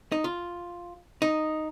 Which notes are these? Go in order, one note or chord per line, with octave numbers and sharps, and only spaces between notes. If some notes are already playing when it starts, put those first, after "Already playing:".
D#4
F4
D#4